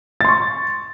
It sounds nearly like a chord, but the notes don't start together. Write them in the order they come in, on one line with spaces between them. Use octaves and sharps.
A6 C6 C#6